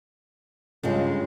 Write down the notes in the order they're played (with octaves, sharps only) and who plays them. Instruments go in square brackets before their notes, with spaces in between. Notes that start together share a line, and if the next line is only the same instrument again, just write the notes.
[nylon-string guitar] G2 C#3 G#3 [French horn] F4